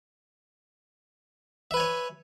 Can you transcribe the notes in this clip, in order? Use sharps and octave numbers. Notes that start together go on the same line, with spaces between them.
B4 C#5 E5 G#5